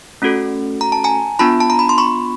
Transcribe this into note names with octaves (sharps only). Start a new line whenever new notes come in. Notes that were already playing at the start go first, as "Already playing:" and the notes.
A3 C#4 F#4 A4
A#5
A5
G#5 A#5
B3 D4 F4 A5 B5
A5
A#5
B5
C6
B5 C#6